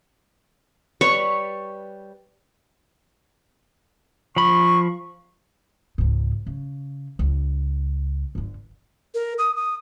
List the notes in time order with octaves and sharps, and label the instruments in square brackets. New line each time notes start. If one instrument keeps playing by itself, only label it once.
[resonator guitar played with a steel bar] G3 B4 C#5 [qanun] C#6
[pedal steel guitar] F3 B5 [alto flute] C#6
[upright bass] C#2 G#2
C#3
C#2
G1 D3
[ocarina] A#4
D#6
D#6